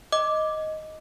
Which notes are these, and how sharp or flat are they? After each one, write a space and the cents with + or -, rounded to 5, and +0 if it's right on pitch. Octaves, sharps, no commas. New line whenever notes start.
D#5 +0 D6 +0